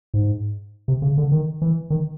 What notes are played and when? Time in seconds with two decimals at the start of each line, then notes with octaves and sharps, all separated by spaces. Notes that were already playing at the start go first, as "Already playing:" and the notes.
0.14 G#2
0.88 C3
1.02 C#3
1.18 D3
1.32 D#3
1.62 E3
1.90 D#3